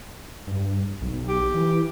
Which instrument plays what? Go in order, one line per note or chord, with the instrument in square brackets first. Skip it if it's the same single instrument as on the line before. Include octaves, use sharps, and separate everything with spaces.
[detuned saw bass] G2
B1
[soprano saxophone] G4
[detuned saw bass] E3